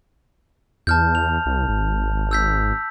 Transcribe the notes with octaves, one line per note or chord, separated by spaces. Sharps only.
E2 A5 F6 G6
F7
C2
G#1
E6 G6 B6